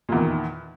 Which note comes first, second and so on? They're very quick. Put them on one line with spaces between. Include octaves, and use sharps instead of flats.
A#2 E2 D#3